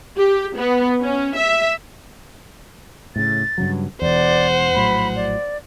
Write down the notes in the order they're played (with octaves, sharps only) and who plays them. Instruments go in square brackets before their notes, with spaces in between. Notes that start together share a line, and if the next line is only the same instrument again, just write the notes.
[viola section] G4
B3
C#4
E5
[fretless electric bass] A2 C#3 [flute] A6
[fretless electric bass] G2 C#3 F#3
[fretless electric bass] E1 E2 [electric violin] C5 F#5 [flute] D5
[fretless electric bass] A#1 A2 F#3 [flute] B5
[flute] D5